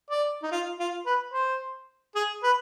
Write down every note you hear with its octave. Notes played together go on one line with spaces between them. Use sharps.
D5
D#4
F4
F4
B4
C5
G#4
B4